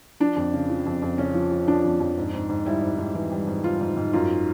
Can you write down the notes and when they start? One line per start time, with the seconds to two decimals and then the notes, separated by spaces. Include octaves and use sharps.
0.20 F3 D4
0.36 F2
0.54 C#3
0.70 F3
0.86 F2
1.02 F2
1.18 C#3 C#4
1.34 F3
1.52 F3
1.68 F3 D4
1.84 F2
2.00 F2
2.17 G#2
2.33 G#2
2.49 G#2
2.66 G3 E4
2.83 G#2
2.98 G#2
3.15 E3
3.31 G3
3.47 G#2
3.64 G3 F4
3.81 G#2
3.96 G#2
4.13 F#2 F4